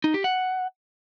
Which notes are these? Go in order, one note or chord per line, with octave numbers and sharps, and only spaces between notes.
D#4
G4
F#5